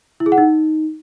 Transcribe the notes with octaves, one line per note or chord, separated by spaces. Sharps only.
E4
G#4
F#5
D#4